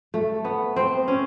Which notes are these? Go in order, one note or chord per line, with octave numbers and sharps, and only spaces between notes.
A3
B3
C4
C#4